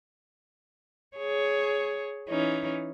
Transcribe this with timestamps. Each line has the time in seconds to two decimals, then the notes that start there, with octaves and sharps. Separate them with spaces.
1.17 G#4 C#5
2.29 E3 C#4 D#4